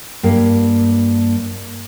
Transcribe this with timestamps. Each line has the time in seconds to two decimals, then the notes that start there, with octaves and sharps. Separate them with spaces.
0.23 G2 A#3